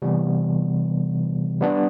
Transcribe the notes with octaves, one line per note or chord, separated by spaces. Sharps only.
C3 E3 G3 B3
G3 B3 D4